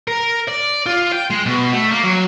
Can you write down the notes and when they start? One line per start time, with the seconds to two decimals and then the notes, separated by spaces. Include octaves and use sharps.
0.07 A#4
0.48 D5
0.86 F4
1.12 G5
1.30 G#3
1.46 B2
1.73 A3
1.92 A#3
2.04 F#3